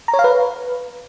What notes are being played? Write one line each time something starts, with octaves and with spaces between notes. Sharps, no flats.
A#5
C#5
F5
B4